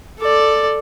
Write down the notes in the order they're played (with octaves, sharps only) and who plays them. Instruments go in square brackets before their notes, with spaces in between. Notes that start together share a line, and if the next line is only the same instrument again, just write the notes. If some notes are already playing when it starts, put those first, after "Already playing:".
[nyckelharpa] A4 D5